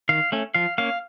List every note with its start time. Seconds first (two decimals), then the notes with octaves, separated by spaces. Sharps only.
0.09 D#3 F5
0.32 A3 C#4
0.54 F3 F5
0.78 A#3 C#4 F5